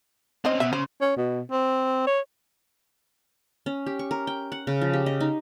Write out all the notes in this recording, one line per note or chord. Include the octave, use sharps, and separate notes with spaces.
D#3 C4 C#4 C5 D#5
B2 E5
C#3 C5
C#4
B2
C4
C#5
C#4
G4
C#6
A#4
G5
F#5
C#3
F3
G4
D#5
D#4